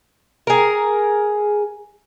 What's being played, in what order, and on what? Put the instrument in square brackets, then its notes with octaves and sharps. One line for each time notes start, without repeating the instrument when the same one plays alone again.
[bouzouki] G#4 A#4